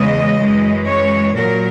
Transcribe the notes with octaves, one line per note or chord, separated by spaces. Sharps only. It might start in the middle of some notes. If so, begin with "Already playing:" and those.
Already playing: E2 C#3 E3 G#3 D#5
F#2 E3 G#3
C#5
A#2 F#3 A#4